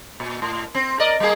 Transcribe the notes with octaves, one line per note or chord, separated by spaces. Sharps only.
A#2
A2
C4
A#4 D5 D#5
G3 A#3 G#4